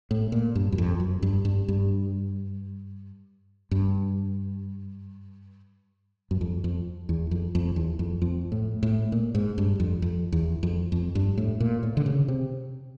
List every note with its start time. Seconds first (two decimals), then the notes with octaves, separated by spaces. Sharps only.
0.11 A2
0.32 A#2
0.55 G2
0.72 F#2
0.78 F2
1.00 F#2
1.22 G2
1.45 G2
1.68 G2
3.71 G2
6.31 F#2
6.41 F2
6.64 F2
7.09 E2
7.31 F2
7.55 F2
7.76 E2
7.99 F2
8.22 F2
8.52 A2
8.83 A2
9.12 A#2
9.35 G#2
9.58 G2
9.80 F2
10.02 F2
10.32 E2
10.63 F2
10.92 F2
11.15 G2
11.38 A2
11.60 A#2
11.83 A2
11.97 D3
12.06 C#3
12.28 C3